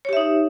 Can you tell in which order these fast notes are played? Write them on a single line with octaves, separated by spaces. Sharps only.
C#5 G4 E5 D#4